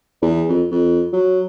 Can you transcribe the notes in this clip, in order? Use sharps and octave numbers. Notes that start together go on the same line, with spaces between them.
E2
F2
F2
F#3